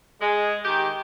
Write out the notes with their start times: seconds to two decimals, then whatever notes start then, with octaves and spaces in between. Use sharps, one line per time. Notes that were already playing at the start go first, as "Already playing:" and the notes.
0.21 G#3
0.65 D#3 G4